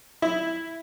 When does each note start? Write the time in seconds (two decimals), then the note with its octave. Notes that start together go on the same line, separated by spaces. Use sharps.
0.22 E4